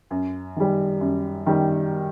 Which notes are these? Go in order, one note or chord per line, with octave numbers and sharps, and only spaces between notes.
F#2
D#3 G3
F#2
D#3 G3